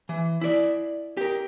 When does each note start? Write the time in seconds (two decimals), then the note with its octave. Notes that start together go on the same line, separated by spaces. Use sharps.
0.09 E3
0.41 E4 D5
1.17 G4 A#4